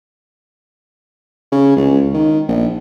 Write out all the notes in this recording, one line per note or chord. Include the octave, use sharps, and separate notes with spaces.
C#3
C#2
D#3
A#1